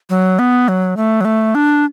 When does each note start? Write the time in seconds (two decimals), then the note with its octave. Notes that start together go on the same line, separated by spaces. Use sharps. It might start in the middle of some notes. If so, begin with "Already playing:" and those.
0.10 F#3
0.39 B3
0.68 F#3
0.97 A3
1.21 F#3
1.25 A3
1.55 D4